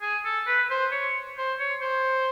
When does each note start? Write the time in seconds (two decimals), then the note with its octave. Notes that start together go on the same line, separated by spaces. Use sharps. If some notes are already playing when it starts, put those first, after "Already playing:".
0.01 G#4
0.25 A4
0.47 B4
0.70 C5
0.92 C#5
1.38 C5
1.59 C#5
1.82 C5